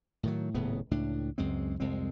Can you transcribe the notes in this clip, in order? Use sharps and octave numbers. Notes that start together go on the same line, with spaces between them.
A2 D#3 F#3
D#1 A2 C#3 B3
C#2 A2 D4
C#2 F#2 G#3 C4
C2 F2 G#3 C4